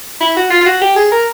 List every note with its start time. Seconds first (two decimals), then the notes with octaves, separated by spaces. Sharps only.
0.21 E4
0.37 F#4
0.51 F4
0.61 F4
0.66 F#4
0.82 G4
0.96 G#4
1.12 A#4